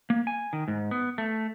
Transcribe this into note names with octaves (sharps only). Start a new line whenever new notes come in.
A#3
G#5
D#3
G#2
B3
A3